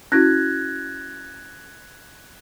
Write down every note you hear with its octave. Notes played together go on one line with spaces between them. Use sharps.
C#4 E4 F#4 F#6 G#6 A#6